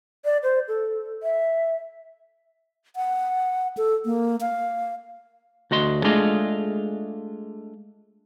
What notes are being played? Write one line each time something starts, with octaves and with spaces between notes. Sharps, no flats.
D5
C5
A4
E5
F#5
A4
A#3
F5
D2 F#4 D#5 C6
G#3 A3 D4 F4 G#4 D#5